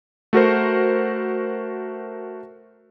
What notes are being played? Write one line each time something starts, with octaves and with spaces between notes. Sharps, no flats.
A3 F#4 A#4 C5